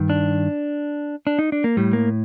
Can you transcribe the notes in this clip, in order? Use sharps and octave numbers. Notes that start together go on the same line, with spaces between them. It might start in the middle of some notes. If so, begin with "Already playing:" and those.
Already playing: G2 D#3
D4
D4
D#4
D4
A#3
A2 G3
A#3